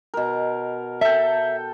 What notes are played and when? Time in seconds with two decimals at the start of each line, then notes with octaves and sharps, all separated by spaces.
0.14 B2 A#4
1.01 A4 E5 G5